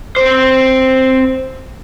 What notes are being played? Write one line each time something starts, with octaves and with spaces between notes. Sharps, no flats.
C4 C5